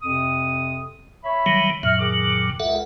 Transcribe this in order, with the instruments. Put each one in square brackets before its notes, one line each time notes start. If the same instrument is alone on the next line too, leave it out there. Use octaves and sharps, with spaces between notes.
[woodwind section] F2 C3 D#6
C#5 E5 B5
[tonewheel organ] D#3 F#3 G3
[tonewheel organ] F#2 A#2 F#3 [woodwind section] E5 F6
[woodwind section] D#3 G#4 D6
[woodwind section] C#2 [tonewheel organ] A4 E5 F#5